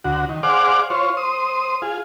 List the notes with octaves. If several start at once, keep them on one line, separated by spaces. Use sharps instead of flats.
D2 F#4
D#3
G#4 C5 D5 F5 F#5 D6
F4 C5 C#5
C5 D#6
F4 G#4